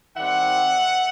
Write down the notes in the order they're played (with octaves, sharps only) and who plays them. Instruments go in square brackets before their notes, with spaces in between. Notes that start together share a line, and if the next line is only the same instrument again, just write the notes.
[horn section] D#3 G3 C4 E5 F#5